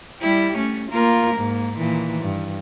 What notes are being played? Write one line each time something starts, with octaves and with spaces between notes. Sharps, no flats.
G3 E4 G4
A3 C#4
A#3 F4 A#4
G#2 A#3
A#2 D#3 E3
G2